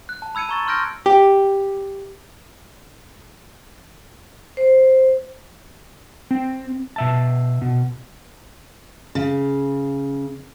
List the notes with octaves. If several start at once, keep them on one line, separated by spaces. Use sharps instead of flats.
F#6
A5
B5 E6 G#6 C#7 D#7
A#5 C#6 A6
C6 C#6 F6 G6 A#6 D7
G4
C5
C4
B2 E5 A5
B2
C#3